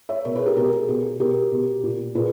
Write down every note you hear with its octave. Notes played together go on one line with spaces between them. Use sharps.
C#5 E5
B2 A#4 C#5
G#4 B4
G4 A#4
B2 G4 A#4
G#4
B2 G#4
B2 G4 A#4
B2
A#2
A#2 G#4 B4